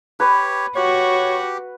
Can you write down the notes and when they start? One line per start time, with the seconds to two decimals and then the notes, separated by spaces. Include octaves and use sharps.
0.20 G4 B4 C#5
0.76 F#4 G4 C#5